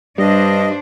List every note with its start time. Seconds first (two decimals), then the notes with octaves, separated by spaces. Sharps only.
0.18 G2 G3 D4 C5 D#5